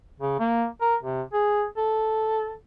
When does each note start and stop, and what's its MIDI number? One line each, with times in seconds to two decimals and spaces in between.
0.20 0.36 49
0.39 0.66 58
0.81 0.95 70
1.03 1.22 48
1.33 1.65 68
1.77 2.53 69